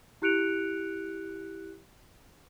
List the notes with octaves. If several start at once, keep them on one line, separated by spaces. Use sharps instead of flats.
E4 G4 F#6 C#7 D7 F7